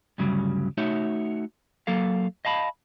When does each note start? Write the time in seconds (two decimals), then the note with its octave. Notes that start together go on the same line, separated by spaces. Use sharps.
0.18 D2 G2 C#3 F#3 G3
0.77 A3 D#4 F#4 C#5 E5
1.87 F#3 A#3 A4 F5
2.45 D#5 F5 A5 B5